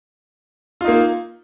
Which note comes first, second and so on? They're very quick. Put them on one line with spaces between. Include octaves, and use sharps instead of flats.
F4 D#4 A#3